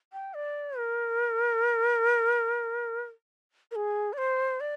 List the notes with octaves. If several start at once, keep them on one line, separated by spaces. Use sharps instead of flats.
G5
D5
A#4
A#4
G#4
D5
C5
D5